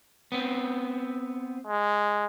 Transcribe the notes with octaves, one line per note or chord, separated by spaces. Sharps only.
B3 C4
G#3